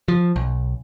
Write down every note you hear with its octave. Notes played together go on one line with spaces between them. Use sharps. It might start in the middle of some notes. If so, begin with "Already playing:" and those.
F3
B1